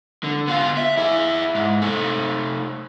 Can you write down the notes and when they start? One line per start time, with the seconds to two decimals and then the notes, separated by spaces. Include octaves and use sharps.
0.24 D3
0.48 B3 F4
0.77 E5
0.97 E4 G#4
1.55 G#2
1.82 A3 D#4